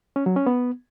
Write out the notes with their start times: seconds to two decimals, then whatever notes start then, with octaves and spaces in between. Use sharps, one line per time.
0.16 C#4
0.26 F#3
0.36 C#4
0.46 B3